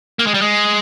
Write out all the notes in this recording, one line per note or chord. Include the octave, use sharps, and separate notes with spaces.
A#3
G#3
G3
G#3